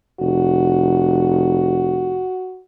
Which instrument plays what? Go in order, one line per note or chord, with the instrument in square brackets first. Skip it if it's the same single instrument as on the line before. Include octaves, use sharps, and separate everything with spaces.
[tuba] F1 [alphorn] F#4